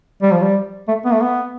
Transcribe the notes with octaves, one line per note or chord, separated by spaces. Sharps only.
G3
F3
G3
A3
B3
A3
B3